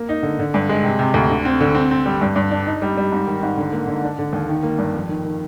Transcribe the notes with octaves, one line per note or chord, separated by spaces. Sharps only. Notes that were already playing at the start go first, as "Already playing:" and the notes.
Already playing: A#3
D#4
D3
D3
G2
G#3
C3
C3
D2
D3
C4
D3
C4
C4
G3
G2
G2
D4
D#4
G3
G3
G#2
D#3
G#2
D3
A#3
D3
D4
D3
D#2
D#3
A#3
G2
F2
D#3
D#3